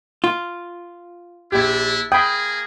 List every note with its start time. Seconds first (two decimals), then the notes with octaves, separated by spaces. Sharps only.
0.24 F4
1.52 A#1 D4 E4 G4
2.12 A#3 G#4 G5 B5 D#6